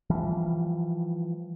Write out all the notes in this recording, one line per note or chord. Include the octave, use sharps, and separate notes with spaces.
E3 F3 G3